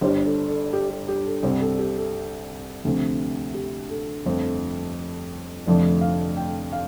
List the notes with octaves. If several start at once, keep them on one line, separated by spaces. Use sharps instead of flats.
G1 G2 G3 C5
A4
A4
G4
G4
G4
A4
C2 C3 G3 C4 C5
A4
G4
A4
D2 C3 F3 A3 C4
G4
A4
G1 F2 F3 A3 C4
F1 F2 D3 F3 A3 D5
F5
G5
F5